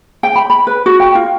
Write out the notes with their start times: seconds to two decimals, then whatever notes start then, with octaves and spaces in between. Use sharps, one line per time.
0.23 G5
0.36 B5
0.50 B5
0.67 B4
0.86 F#4
1.00 G5
1.15 F4